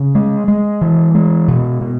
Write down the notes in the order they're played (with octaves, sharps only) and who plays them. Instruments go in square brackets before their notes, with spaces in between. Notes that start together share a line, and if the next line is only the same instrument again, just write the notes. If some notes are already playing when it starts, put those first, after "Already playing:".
Already playing: [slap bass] C#3
G#3
G#3
E3
G#3
B2
B2